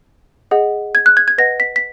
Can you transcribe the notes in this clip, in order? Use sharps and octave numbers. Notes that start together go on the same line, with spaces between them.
G#4 D#5 F#5
G#6
F#6
G#6
G#6
B4 D#5 F#5 A#6
B6
B6